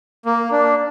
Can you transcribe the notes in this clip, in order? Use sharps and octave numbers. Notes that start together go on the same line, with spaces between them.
A#3
D4